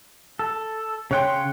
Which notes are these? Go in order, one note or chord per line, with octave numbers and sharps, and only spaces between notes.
A4
C#3 C#5 F#5 G5 C6